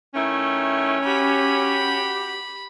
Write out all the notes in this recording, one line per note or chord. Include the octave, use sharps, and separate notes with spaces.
D#3 A3 C#4 E4
F#4 G4 B5